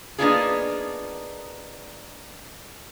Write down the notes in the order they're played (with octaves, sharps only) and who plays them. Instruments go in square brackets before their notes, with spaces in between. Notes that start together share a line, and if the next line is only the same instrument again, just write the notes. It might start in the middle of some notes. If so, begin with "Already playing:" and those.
[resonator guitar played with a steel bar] A#3 B3 D4 D#4 F4 G#4